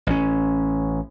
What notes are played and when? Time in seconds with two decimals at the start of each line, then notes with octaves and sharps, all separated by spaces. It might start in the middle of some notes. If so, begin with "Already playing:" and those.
0.07 A1 C#4